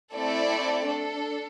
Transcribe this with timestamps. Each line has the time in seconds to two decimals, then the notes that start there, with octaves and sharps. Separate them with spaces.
0.14 A3 C4 E4 A4 D5
0.85 D4 A4